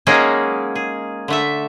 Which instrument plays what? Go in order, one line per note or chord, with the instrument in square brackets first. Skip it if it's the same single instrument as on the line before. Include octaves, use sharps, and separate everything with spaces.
[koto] F#3 G#3 A#3 C#4 D#4 G#4
G#4
D3 A3 E5